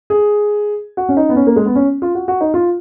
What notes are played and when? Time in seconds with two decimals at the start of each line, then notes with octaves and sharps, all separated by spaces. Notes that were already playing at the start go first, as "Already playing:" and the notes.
0.10 G#4
0.97 F#4
1.09 C#4
1.17 D#4
1.29 B3
1.36 C#4
1.47 A#3
1.56 G#3
1.66 B3
1.75 C#4
2.02 F4
2.15 F#4
2.28 F#4
2.41 D#4
2.54 F4